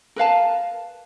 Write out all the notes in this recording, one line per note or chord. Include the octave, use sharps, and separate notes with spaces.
A#4 B4 F5 A5